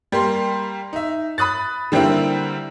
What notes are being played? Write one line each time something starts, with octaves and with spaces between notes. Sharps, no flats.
G3 A#3 C6
D#4 E5
B5 D#6 F#6 A6
D3 G3 A#3 C4 E4